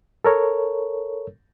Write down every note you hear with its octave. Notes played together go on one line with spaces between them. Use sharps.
A4 A#4 C#5